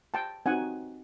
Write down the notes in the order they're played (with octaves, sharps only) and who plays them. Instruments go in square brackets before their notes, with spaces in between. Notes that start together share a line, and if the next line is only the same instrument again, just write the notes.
[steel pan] G5 A5
C4 D#4 F#4 F#5 G#5